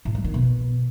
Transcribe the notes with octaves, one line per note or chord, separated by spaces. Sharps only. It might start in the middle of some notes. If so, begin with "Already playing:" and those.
A2
G3
D#3
B2